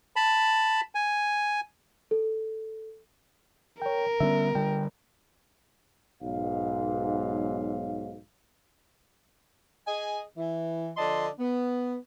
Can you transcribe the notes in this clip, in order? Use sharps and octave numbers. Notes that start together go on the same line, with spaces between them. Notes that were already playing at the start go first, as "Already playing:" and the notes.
A5 B5
G#5
A4
A#4 C#5 G5
D3 G3 B3 C#4 E5
D3 G3 G5
B1 G#2 F5
G#4 D#5 G#5
E3
D3 F3 D4 D#5 A5 C6
B3